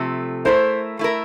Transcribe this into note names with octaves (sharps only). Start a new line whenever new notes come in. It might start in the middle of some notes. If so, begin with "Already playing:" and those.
Already playing: C3 F3 A3
A3 E4 A#4 C5
A3 E4 A#4